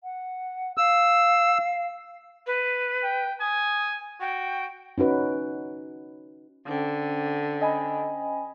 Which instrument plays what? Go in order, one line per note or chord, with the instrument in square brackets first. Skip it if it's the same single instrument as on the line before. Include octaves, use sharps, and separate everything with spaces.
[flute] F#5
[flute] F5 [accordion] E6
[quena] B4
[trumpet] G5
[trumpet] G#5 [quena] D#6
[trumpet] F#4 [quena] G5
[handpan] C#4 D#4 F#4 B4
[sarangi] D3 [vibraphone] C#4 C5 G5
[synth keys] D#5 G#5 B5